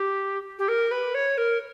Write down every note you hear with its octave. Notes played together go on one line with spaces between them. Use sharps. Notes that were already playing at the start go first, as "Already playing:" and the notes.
Already playing: G4
G4
A#4
B4
C#5
A#4